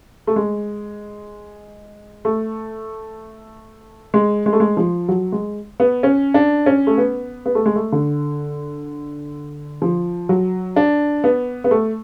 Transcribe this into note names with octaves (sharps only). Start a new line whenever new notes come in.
A3
G#3
A3
G#3
G#3
A3
G#3
F3
F#3
G#3
B3
C#4
D4
C#4
A3
B3
B3
A3
G#3
A3
D3
F3
F#3
D4
B3
B3
A3